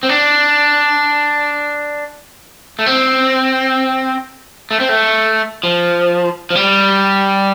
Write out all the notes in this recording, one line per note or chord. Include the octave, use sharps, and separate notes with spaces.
C4
D4
A3
C4
A3
C4
A3
F3
F3
G3